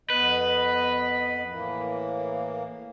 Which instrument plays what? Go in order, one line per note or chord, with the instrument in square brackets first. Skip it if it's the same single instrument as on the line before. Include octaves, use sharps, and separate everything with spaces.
[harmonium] F2 B3 D#5 [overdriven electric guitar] B4
[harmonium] A2 E3 A#3